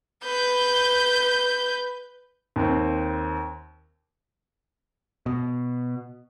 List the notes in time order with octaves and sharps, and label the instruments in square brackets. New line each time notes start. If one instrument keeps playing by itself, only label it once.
[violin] B4 G6
[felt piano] D#2 C4
[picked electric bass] B2